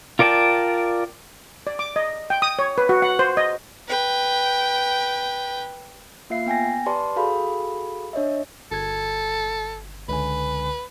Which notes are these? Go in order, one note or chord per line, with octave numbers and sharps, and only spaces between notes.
F4 A#4 D5 G5 A5
D5
D6
D#5
G5
D#6
C#5
B4
F#4
F#5
C5
D#5
B4 G5
A#3 F4 E5 F5 C7
B3 G5 G#5 A#6
G4 B4 D5 A5 C6
F#4 G#4 A4 F5 B5
D4 C#5 D#5 E5
G1 A4 G#6
C#2 D3 B4 G#5